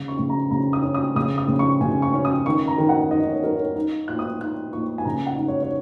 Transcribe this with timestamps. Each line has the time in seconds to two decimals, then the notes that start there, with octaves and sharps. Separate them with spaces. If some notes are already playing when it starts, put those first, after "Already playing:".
Already playing: C#3
0.08 C#6
0.19 C#3
0.30 A#5
0.51 C#3 A#5
0.73 D#6
0.84 C#4
0.94 D#6
1.16 C#3 D#6
1.38 D#6
1.48 C#3
1.59 C#6
1.81 C#3 G#5
2.02 C#6
2.14 C#4
2.25 D#6
2.46 D#3 C#6
2.67 A#5
2.78 D#3
2.89 F#5
3.11 D#4 D#5
3.28 C#5
3.32 D#5
3.43 D#4 A#4
3.54 C#5
3.76 D#4
4.08 A#2 F#6
4.19 D#6
4.40 D#4 F#6
4.73 A#2 C#6
4.98 G#5
5.05 C#3 A#5
5.27 F#5
5.38 D#4
5.48 C#5
5.63 C#5